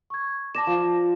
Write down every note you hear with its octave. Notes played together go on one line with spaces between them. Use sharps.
C#6 G#6
D5 A5 A#6 E7
F3